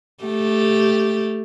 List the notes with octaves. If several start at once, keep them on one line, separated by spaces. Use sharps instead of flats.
A3 G4